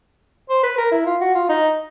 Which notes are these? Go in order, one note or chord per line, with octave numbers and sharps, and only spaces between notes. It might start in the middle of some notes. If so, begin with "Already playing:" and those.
C5
B4
A#4
E4
F4
F#4
F4
D#4